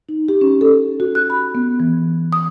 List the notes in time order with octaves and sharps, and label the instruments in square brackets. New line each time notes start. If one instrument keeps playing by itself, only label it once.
[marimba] D#4
G4
C#4
A4
F#4
F#6
B5
B3
E3
D#6